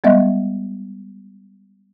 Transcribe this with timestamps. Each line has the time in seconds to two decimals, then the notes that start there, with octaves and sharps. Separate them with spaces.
0.04 G3 G#3 B3 D#5 E5